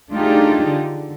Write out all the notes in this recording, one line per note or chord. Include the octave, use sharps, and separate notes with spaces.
A3 D4 D#4 F4 G4 G#4
D3